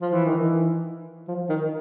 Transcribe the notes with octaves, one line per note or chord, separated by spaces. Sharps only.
F3
E3
D#3
E3
F3
D#3